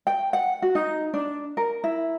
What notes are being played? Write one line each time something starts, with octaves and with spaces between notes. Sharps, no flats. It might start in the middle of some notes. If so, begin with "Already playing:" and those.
G5
F#5
F#4
D#4
D4
A#4
E4